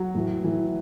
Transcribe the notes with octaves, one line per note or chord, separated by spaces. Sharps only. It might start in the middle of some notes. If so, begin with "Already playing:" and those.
Already playing: F#3
A2 E3
A2 E3